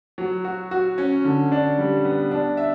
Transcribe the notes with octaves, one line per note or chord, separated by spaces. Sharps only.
F#3
F#4
F#4
C#4
D3
D4
G3
B3
D4
E5